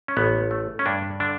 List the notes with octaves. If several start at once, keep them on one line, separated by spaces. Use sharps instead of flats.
C#4
A1 B3
A3
C#4
G2 D4
D3 D4